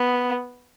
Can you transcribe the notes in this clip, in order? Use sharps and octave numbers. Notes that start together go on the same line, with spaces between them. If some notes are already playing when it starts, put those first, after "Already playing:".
Already playing: B3